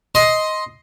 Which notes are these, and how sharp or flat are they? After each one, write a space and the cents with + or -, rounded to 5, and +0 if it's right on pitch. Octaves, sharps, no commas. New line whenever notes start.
D#5 +10 C6 +0